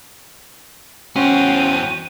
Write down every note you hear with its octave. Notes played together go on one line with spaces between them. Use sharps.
E2 C#4 F#4 C5 F#5 G5 D#7